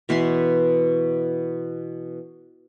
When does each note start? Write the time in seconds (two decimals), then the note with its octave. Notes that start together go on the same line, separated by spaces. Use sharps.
0.09 B2 E3 B4 C6